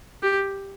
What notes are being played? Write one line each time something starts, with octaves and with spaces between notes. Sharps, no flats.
G4